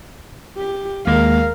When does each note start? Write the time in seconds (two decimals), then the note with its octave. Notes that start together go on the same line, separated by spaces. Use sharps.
0.57 G4
1.07 D#2 G#3 A#3 A#4 F5